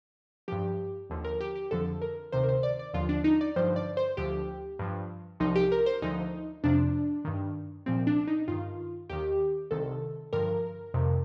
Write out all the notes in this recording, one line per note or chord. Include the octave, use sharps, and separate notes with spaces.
G2 F3 G4
D#2 D3 F3
A#4
G4
G4
F2 D3 F3 A4
A#4
D2 C3 D#3 C5
A#4
C5
D5
D5
D#2 D3 F3 F4
D4
D#4
D5
G2 D3 F3 C5
D5
C5
D2 D3 F3 G4
G2 F3
C2 C3 F3 D#4
G4
A#4
C5
D2 D3 F3 D#4
F2 C3 F3 D4
G2 D#3
C2 A#2 F3 C4
D4
D#4
G2 D#3 F4
D#2 D#3 G4
C2 C3 D#3 A4
G2 D3 F3 A#4
F2 C3 D#3